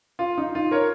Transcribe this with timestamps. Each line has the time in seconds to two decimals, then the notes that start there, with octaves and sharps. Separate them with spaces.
0.19 F4
0.38 D#4
0.55 F4
0.71 A#4 C#5